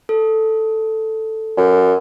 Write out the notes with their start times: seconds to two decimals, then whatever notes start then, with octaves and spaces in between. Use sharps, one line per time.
0.09 A4
1.57 F#2